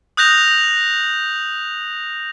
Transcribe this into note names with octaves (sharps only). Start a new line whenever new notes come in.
D#6 F#6 G6 A#6 F7